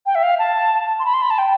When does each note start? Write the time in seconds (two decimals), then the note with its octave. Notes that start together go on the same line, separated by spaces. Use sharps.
0.06 G5
0.15 E5
0.23 F5
0.39 A5
0.99 C6
1.05 B5
1.14 C6
1.22 B5
1.30 A5
1.38 G5